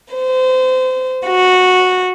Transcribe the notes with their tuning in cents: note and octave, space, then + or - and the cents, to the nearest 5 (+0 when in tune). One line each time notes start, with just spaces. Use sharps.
C5 -30
F#4 -10